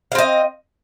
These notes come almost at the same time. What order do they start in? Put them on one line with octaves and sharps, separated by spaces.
F5 C4 D#5